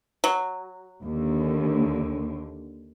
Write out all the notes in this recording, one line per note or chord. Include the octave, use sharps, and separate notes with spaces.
F#3
D#2 D3